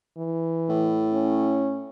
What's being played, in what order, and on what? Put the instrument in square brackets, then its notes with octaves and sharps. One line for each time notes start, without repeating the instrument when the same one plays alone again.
[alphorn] E3
[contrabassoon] A2
[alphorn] C#4